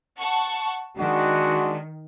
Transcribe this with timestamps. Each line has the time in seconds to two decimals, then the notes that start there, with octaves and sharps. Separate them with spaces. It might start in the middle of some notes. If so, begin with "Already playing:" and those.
0.19 F#5 A5 C#6
0.98 D#3 G#3 D4 F#4